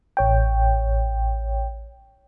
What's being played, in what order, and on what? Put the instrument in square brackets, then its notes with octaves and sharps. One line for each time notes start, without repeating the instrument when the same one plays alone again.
[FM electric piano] A1 C#5 G5